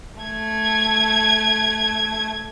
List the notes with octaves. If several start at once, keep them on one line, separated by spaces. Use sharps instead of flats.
A3 G#6